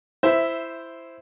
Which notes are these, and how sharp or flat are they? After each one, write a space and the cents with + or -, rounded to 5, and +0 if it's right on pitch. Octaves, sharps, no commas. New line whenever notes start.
E4 +15 C5 +0 E5 +0